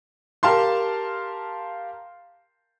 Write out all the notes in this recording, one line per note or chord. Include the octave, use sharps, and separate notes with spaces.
G4 A#4 F5 A5 C6